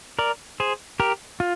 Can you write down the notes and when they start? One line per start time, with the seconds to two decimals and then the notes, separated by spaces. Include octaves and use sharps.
0.19 A#4 D5
0.60 G#4 C5
1.00 G4 A#4
1.40 F4